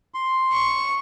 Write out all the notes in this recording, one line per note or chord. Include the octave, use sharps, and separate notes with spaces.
C6
C#6